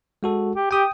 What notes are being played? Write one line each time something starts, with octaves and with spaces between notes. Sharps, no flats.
G#3 F#4 A4
G4
G4 G5 D#6